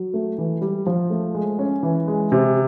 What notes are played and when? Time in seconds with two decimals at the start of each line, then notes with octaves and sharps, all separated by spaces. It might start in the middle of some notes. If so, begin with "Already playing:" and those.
Already playing: F#3
0.14 A3
0.38 E3
0.61 G3
0.86 F3
1.10 A3
1.34 G#3
1.59 C#4
1.83 E3
2.08 G#3
2.32 C3